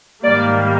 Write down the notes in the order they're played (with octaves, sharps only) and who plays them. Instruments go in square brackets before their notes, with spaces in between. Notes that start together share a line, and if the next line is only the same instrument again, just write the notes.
[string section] G#2 D#3 G3 A#3 D5